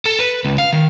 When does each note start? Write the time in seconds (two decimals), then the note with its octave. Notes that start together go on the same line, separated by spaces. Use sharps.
0.06 A4
0.19 B4
0.45 C#2
0.58 F5
0.73 D#3